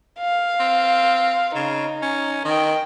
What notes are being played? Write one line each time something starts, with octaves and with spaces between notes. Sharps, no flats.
F5
C4
C#3 D#4
C#4
D#3 D#5 G5